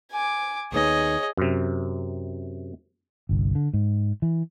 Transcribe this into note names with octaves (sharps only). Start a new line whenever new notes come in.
G#5 D6
D#2 B3 D#4 G#4 C#5 D#5
F#2 C3
G1 C2
D3
G#2
E3